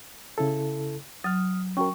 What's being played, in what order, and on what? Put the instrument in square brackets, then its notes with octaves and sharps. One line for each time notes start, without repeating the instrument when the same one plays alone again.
[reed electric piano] C#3 E4 A4
[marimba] F#3 [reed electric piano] D#6 F6
[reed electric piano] C#4 F#4 A#4 [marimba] G5 C#6